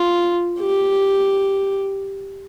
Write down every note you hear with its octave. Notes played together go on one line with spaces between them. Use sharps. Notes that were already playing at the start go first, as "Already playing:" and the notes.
Already playing: F4
G4